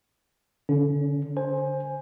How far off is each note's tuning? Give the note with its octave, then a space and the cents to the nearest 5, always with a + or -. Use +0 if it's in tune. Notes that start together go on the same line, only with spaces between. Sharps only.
D3 -25 C#4 +20
C5 +15 G#5 +0